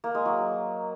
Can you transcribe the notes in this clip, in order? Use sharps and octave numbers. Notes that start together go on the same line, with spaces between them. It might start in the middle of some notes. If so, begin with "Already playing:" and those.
A#3
G#3
F#3